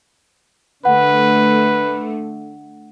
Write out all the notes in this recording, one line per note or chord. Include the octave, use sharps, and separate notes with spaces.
D3 A3 B4 F#5